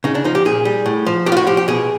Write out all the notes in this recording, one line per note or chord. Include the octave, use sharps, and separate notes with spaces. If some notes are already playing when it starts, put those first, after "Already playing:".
C#3 D#4
D4
F3 D#4
G4
A#2 G#4
G3
A2
F3
A2 G4
F4
F#4
F3 G4
G4
B2 G#4